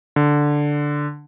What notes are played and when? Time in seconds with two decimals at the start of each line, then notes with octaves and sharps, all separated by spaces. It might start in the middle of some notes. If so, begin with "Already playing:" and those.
0.16 D3